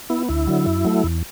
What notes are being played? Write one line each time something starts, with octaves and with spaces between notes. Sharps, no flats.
B3 E4
D2 E4
D3 F#3
F#2
F#3 A3
E2